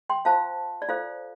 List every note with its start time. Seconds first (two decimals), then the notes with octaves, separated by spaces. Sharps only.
0.09 G5 C6
0.25 F4 C5 F5 A5
0.82 D5
0.89 F4 A4 C5 F5